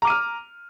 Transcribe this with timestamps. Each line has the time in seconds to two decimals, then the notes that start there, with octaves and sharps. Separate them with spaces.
0.02 A#5
0.05 D6
0.07 D#7
0.10 F6